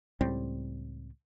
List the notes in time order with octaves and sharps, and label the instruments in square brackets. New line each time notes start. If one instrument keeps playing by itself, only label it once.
[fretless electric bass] C#2 A2 G3 C4